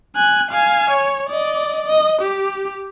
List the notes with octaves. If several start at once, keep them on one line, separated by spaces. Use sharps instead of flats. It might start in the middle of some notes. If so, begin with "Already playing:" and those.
G#5 F#6
F5 G#5
C#5
D5 D#5
D#5
G4